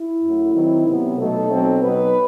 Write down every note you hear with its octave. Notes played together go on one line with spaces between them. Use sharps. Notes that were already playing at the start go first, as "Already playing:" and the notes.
Already playing: E4
F#2 F#3 A3
D#3 F#3 C4 D#4
C3 F#3 B3
B2 F#3 A3 D#4 A4
B2 F#3 C4 D#4
B2 F#3 B3 D#4 B4